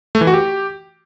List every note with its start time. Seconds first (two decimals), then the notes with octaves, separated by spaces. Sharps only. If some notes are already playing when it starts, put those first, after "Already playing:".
0.15 A3
0.21 E3
0.27 F#4
0.33 G4